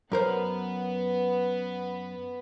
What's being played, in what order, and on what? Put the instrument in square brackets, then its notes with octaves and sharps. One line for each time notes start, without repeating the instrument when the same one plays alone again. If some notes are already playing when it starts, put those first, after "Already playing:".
[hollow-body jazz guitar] F#2 A#4 C5 [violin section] B3